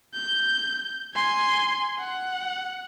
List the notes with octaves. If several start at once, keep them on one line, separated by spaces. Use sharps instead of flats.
G6
G#5 C6
F#5